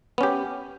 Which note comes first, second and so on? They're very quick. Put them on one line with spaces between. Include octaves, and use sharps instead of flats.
B3 C#4 G4